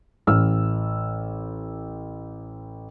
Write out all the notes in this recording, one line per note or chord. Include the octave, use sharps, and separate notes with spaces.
A1 E6 F6